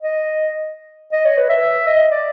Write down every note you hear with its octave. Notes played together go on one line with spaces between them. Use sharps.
D#5
D#5
C#5
B4
E5
D#5
D5